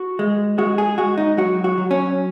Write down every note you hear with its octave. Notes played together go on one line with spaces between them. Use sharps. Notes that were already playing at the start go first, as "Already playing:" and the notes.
Already playing: F#4
G#3
G#3 F#4
G#4
G#3 F#4
D#4
F#3 F#4
F#4
F#3
C#4